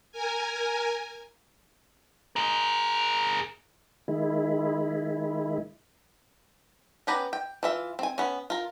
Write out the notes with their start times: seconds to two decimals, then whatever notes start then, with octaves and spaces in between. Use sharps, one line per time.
0.12 A#4 G#5
2.36 G#4 A#4
4.08 D#3 G#3 E4
7.07 B3 C#4 G4 B4 A#5
7.33 G5
7.63 E3 F4 E5
7.99 C4 G#5
8.18 B3 C#4
8.50 F4 A#4